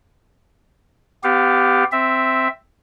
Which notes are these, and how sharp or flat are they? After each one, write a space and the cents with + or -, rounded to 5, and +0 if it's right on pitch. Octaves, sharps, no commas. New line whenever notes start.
B3 +35 G4 +0 F5 +20
C4 +0 E5 +0